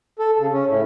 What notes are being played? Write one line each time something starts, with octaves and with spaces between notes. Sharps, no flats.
A4
C#3
C#4
A2